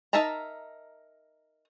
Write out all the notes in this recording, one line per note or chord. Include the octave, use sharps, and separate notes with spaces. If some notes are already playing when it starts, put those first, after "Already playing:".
D#4 A#4 E5 A5 A#5